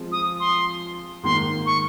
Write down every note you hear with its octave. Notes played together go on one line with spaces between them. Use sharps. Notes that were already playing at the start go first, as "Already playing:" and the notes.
Already playing: F3 G#3 C4 F4
D#6
C6
G#2 D#3 A#3 C6
C#6